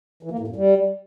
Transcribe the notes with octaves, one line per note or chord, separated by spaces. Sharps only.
E3
A#3
A2
F#2
G3